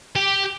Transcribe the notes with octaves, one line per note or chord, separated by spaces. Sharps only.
G4